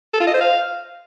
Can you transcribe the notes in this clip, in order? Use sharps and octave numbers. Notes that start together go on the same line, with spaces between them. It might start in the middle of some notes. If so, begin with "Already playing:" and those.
A4
F4
D#5
C5
F5